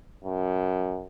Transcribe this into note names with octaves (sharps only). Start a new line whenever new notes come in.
F#2